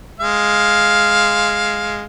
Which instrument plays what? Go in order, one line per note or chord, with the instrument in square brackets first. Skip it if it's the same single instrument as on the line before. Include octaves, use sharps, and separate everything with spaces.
[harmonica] G#3 F5